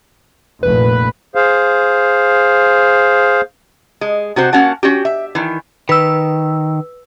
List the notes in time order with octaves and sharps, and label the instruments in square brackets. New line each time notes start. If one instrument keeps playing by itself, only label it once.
[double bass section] F1 A#1 A#2 [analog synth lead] B4
[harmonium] G#4 C5 F5
[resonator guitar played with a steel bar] G#3
C3 F#4 C5
A#3 C#4 F#4 F#5 A5
C#4 F#4 G4
E5
D#3 E3
[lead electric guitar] D#3 [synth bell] B4 E6